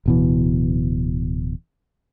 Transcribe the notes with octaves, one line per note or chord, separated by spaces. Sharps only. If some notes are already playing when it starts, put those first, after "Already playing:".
D1 B2 E3